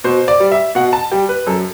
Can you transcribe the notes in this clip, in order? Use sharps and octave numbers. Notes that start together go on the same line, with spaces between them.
B2 C5
D5
G3
E5
B2 F#5
A5
G3 G5
B4
F#2 A4